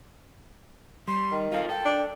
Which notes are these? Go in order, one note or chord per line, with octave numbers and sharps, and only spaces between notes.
G3 C6
D#3
F4 A4 F5
A4 G5
D4